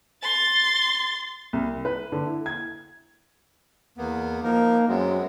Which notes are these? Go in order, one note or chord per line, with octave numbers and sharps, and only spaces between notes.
C6 A6
C2
B4
D3
E4
G#6
E2 A#3 B3
F3 A#3 D#4 A#4
F#2 G#3 B3 C4